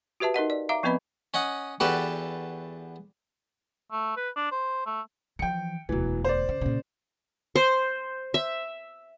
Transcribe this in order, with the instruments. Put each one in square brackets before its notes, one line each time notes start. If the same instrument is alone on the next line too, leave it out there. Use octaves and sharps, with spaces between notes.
[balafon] F#4 G4 B4 E5 A5
D#4 A#4 D#5 F#5
D5
E5 F5 A#5 D6
F3 B3 C4 B4 D#5 B5
[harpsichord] C#4 D#5 F#5
E2 D4 F#4 G4 A4 B4
[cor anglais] A3
B4
D4
C5
A3
[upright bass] E3 F3 [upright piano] G5 C#7
[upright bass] E1 D2 [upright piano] E3 F#3
[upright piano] C5 D5
[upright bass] C#3
A#2 C#3
[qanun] C5
E5